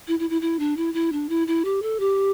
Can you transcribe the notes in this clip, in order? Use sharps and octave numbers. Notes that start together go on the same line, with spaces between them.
E4
E4
E4
E4
D4
E4
E4
D4
E4
E4
G4
A4
G4